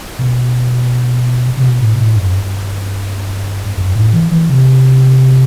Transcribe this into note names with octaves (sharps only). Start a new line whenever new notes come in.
B2
C3
B2
A2
B2
A2
F#2
G2
F#2
A2
E3
E3
C3